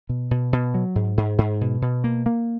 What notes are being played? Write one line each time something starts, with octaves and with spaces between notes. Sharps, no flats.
B2
B2
B2
F#3
G#2
G#2
G#2
B2
B2
A#3
A#3